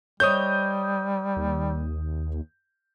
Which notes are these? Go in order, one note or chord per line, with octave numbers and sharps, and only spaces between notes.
G3 C5 C#5 D#5 D#6 G6
D#2